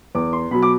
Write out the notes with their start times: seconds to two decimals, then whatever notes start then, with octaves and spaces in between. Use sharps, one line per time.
0.15 E2 D6
0.33 C6
0.51 B2 F#3 B5
0.62 D6